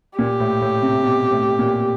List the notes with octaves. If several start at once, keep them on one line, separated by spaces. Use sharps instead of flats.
A#2 G4
A2
A2
C3
B2
A2
A#2